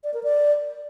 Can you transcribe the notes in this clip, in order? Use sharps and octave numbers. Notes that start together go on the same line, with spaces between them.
D5
A#4
D5